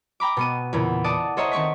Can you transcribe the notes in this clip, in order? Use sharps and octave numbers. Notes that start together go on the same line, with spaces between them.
G5 A#5 B5 D6
B2 B3 D#7
E2 A#2 C#3
D5 F#5 A5 D6 D#6
A4 C5 C#5 D#5 E5 A#5
D#3 C4 C#6 B6